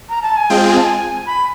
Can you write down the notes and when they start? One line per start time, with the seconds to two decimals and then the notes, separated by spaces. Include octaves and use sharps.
0.09 A#5
0.22 A5
0.37 G#5
0.50 G#3 C4 F4 G#4 G5
0.69 G#5
0.77 A5
0.85 G#5
1.26 B5